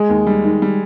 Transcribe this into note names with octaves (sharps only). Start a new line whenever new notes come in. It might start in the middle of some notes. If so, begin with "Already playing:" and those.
Already playing: G#3 G#4
D#2
G3
D#3
G3